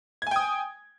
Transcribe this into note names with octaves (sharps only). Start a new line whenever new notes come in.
G5 G#5 D#6 G#6